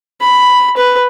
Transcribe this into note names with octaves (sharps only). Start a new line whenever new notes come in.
B5
B4